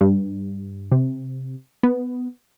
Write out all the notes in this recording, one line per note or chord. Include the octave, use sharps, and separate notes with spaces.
G2
C3
B3